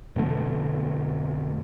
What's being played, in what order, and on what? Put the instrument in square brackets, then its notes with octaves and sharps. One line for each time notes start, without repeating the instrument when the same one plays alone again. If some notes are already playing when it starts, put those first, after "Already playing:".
[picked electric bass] F2 B2 D3 A3